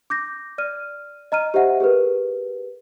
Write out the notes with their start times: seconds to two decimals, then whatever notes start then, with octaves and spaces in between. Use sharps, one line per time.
0.10 D6 G6 A#6
0.58 D5 F6 D#7
1.32 D#5 A#5 F6 D#7
1.54 G4 C5 D#5 E5 F#5
1.80 G4 G#4 A#4 B4